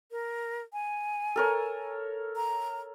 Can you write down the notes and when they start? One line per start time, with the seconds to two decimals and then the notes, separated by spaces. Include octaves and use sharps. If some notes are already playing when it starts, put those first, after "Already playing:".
0.11 A#4
0.73 G#5
1.36 A4 A#4 C#5
2.36 A#5